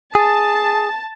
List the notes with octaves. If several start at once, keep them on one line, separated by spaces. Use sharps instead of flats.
G#4 A5